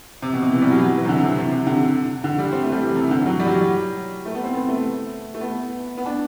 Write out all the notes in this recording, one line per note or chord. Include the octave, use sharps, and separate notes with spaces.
C3
B2
C3
E3
G3
F#3
F#3
E3
C3
D3
C3
C3
C3
D3
D3
G3
C4
A3
G3
E3
C3
D3
F#3
G3
F#3
G3
A3
B3
C4
B3
A3
A3
B3
B3
D4